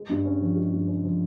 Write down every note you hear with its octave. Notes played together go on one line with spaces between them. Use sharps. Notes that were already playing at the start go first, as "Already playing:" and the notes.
Already playing: G#3
G2
C#4
F3
G#3
G2
C#4
F3